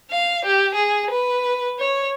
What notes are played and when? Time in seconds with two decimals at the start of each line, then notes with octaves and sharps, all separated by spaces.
0.11 F5
0.45 G4
0.75 G#4
1.10 B4
1.79 C#5